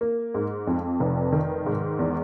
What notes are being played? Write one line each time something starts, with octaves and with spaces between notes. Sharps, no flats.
A#3
G#2
F2
F1
D#3
G#2
E2